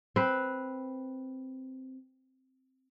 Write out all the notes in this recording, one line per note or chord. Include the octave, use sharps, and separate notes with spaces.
C4 B4